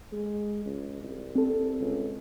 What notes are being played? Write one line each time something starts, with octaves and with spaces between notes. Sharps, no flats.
G#3
C#2
C2
C4 A4
C#2